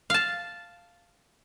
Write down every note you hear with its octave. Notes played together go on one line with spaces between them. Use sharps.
F5 A5